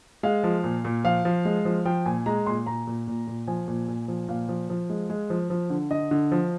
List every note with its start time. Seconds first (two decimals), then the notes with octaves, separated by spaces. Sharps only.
0.23 G#3 F5
0.44 F3
0.64 A#2
0.85 A#2
1.04 F3 F5
1.25 F3
1.45 G#3
1.65 F3
1.85 F3 G5
2.06 A#2 G#5
2.26 G#3 A#5
2.46 A#2 C6
2.66 A#2 A#5
2.87 A#2
3.07 A#2
3.27 A#2
3.47 F3 G#5
3.68 A#2
3.88 A#2
4.08 F3
4.28 A#2 F5
4.49 F3
4.70 F3
4.90 G#3
5.10 G#3
5.30 F3
5.50 F3
5.70 D3
5.91 D3 D#5
6.11 D3
6.32 F3